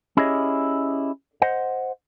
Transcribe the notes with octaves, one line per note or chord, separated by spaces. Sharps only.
C#4 E4 G4 G#4 C#5 D#5
C5 D#5 F#5